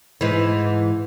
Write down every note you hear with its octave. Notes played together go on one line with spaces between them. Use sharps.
G#2 E3